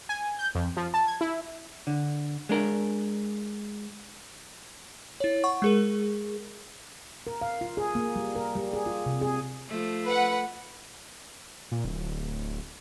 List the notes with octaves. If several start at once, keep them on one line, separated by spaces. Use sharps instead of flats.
G#5
G6
F2
F3
A5
G#6
E4
D3
G#3 D4 A#4
E4 C#5
F#5 C#6
G#3 G#4 A#4
A#4
F5
F4
G#4
A#3
G3
A#4
G3
G#4
F4
C3
G#4
F3 A3
B4 F#5
A#2
D1